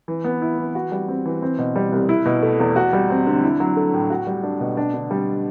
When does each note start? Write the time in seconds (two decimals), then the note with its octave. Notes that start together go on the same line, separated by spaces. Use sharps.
0.08 E3
0.24 B3
0.42 E4
0.58 E3
0.75 F#4
0.92 G3
1.08 C4
1.26 E3
1.42 C4
1.58 B2
1.76 G3
1.92 C2
2.09 E4
2.26 B2
2.42 A3
2.60 E2
2.76 F#4
2.93 G3
3.10 C4
3.27 D3
3.43 E4
3.60 F#3
3.76 A3
3.94 A2
4.10 F#4
4.27 G3
4.43 D4
4.60 B2
4.77 D4
4.94 D3
5.11 G3